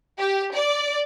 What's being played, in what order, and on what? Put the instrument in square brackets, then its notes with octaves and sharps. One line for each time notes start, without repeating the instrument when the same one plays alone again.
[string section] G4
D5